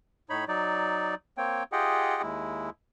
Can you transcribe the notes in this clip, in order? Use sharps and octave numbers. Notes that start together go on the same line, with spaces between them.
A2 D#4 C#5 B5
F#3 D#4 D5
A#3 C4 C#5 G5
F4 G4 G#4 D#5 F#5 G5
D#2 G#3 E4